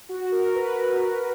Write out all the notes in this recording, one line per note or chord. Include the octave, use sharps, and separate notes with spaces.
F#4
A#4
B4